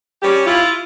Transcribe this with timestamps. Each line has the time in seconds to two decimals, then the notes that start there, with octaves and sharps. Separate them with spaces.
0.22 G3 C#4 G4
0.46 E4 F4